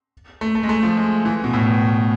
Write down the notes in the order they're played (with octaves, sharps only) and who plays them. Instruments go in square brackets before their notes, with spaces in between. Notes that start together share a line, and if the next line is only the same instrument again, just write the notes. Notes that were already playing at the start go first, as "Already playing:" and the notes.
[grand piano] A3
A3
G#3
A3
F3
G#3
E3
B2
A2